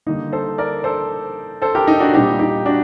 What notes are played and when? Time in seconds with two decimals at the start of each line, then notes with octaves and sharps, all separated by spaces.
0.06 D3 G3 A#3 D#4
0.32 A4 C5
0.58 A#4 D5
0.84 A4 C5
1.62 A4 C5
1.75 G4 A#4
1.87 D#4
2.00 D4 F#4
2.14 A#2 G3 C4 D#4 G4
2.39 D#4 G4
2.66 D4 F#4